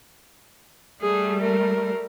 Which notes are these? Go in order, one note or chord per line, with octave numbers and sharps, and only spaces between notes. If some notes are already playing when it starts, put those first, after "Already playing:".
G3 A3 G#4
A#4